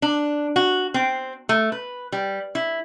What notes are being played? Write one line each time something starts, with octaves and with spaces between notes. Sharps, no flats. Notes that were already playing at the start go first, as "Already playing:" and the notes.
D4
F#4
C4
A3
B4
G3
E4